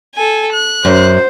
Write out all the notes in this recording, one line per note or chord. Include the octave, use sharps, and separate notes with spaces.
A4 G#5
F#6
F#2 C5